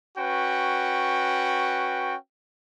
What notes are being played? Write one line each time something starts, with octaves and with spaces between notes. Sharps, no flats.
C#4 F#4 B4 G5